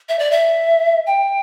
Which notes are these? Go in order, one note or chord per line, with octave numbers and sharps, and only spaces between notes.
E5
D5
E5
G5